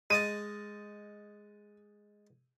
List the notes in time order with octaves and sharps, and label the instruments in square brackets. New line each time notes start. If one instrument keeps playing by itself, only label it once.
[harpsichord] G#3 D#5 A5 [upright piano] D#7